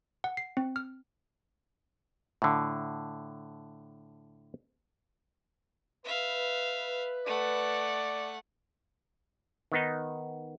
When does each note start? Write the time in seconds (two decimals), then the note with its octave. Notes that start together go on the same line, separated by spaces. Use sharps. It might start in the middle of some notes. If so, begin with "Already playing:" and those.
0.24 F#5
0.37 C7
0.57 C4
0.76 F6
2.42 A2 D3
6.05 B4 E5 F5
7.26 A3 D5 F#5
9.72 D#3 B3 D#4